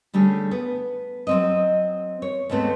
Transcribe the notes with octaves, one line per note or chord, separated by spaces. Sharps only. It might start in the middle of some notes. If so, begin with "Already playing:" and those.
D3 G3 A3 C#4 G#4
B3
F#3 C4 D#5
C#5
D#2 G#2 A3 B3 C4